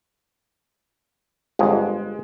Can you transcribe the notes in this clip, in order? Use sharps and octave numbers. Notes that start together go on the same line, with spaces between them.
G1 F2 G#3 G#4